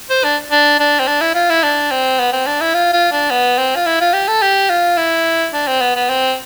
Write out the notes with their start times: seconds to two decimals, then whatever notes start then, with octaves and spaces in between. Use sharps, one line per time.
0.10 C5
0.24 D4
0.51 D4
0.79 D4
0.99 C4
1.07 D4
1.21 E4
1.35 F4
1.50 E4
1.63 D4
1.91 C4
2.19 B3
2.32 C4
2.47 D4
2.61 E4
2.74 F4
2.93 F4
3.12 D4
3.31 B3
3.58 C4
3.76 F4
3.86 E4
4.01 F4
4.14 G4
4.28 A4
4.42 G4
4.70 F4
4.97 E4
5.53 D4
5.67 C4
5.81 B3
5.96 B3
6.09 C4